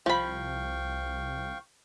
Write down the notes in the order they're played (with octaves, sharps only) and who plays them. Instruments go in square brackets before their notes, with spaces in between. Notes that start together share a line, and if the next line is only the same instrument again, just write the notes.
[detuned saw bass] C2 [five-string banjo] F3 B5 [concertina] F5 G5 C#6